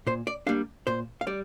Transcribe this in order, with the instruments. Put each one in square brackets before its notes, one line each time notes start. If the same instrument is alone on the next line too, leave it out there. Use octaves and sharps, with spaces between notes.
[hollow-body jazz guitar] A#2 C5
D5
G3 A#3 D4 F5
A#2 C5
F5
G3 D5